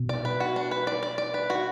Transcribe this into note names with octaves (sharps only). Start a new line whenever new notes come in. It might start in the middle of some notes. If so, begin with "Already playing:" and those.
Already playing: B2
D5
B4
F#4
D4
B4
D5
D5
D5
B4
F#4